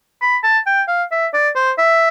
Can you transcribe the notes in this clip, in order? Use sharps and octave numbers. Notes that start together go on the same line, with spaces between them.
B5
A5
G5
F5
E5
D5
C5
E5